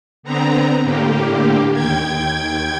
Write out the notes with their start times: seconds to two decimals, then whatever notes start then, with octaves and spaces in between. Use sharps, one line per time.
0.23 D3 B3 C4 A#5
0.83 A2 D3 A#3 G4
1.72 D#2 G5 G#6